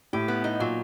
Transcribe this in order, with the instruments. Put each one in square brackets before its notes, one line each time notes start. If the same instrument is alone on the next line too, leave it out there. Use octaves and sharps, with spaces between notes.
[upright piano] A2 [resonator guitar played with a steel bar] G4
[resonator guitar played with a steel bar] B3
D#4
[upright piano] A#2 [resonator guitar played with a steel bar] F#3